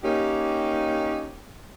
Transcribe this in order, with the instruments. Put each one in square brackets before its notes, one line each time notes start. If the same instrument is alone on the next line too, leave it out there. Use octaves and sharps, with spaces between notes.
[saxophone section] A#3 C#4 D#4 G4